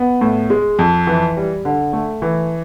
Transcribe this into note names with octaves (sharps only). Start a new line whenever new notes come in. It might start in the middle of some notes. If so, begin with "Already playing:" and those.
Already playing: B3
A2
G#3
F2
E3
G3
D3
A3
E3